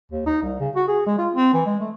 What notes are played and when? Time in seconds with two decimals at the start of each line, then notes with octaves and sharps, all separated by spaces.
0.12 D#2
0.26 D#4
0.42 C2
0.60 C#3
0.75 F#4
0.88 G#4
1.07 G#3
1.18 F4
1.35 C4
1.53 E3
1.66 G#3
1.80 A3